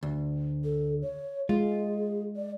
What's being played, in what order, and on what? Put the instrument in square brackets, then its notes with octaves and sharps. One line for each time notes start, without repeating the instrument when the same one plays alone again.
[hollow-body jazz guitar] D2
[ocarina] A4
C#5
[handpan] G#3 [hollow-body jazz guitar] F4 [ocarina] G#4
[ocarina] D5